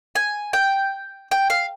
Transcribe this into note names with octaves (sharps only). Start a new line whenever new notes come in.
G#5
G5
G5
F5